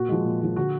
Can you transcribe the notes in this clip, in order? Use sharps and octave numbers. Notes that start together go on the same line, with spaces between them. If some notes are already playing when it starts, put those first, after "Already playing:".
Already playing: A#2 F#4
F3 G#3
A#2
F3 G#3
D3 F#4